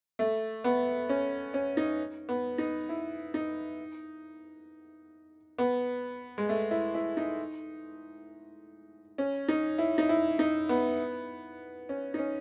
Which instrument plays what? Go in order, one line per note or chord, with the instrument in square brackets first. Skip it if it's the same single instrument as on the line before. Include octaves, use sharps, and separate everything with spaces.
[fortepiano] A3
B3
C#4
C#4
D#4
B3
D#4
E4
D#4
B3
G#3
A3
E4
E4
D#4
C#4
D#4
E4
D#4
E4
D#4
B3
C#4
D#4
C#4